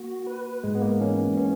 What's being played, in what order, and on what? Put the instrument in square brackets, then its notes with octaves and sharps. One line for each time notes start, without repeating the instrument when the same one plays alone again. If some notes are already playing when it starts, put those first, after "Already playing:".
Already playing: [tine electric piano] A#3 [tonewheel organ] F#4
[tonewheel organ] B4
[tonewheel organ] G#2 [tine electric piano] G#3
[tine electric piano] B3
A#3
[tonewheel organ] E3 [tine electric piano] C#4
[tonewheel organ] B3 [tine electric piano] C#4